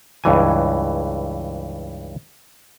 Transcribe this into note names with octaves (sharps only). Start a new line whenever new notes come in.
C#2 G2 E3 G#5